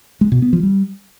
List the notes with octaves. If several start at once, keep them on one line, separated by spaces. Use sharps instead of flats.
G#3
B2
B3
F3
G3